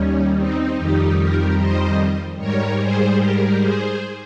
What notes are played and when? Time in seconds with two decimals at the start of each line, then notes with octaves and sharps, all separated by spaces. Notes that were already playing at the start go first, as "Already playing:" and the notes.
Already playing: D#2 D#3 G3 C#4
0.37 C4 D#4
0.77 F2 D#3 G3 D#4 G4
1.17 G4 A#4
1.57 C5 D#5
2.38 G#2 G3 A#4 C#5
2.79 G#4 C5
3.18 G4 A#4
3.59 G#4 C5